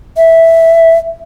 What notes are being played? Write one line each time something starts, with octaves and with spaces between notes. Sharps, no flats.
E5